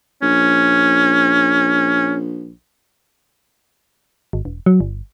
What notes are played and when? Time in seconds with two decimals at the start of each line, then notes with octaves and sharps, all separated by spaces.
0.22 A#1 C#4
4.33 G#1
4.45 E1
4.66 F#3
4.81 G1